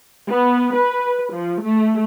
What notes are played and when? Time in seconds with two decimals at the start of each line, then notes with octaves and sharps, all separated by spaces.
0.29 B3
0.73 B4
1.32 F3
1.63 A3